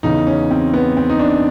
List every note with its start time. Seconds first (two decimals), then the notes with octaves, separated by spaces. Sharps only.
0.03 E2 C#3 E3 D#4
0.27 C#4
0.51 C4
0.73 B3
0.97 C4
1.09 D#4
1.19 D4